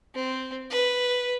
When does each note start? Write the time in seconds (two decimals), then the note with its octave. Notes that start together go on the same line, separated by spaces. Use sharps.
0.15 C4
0.70 B4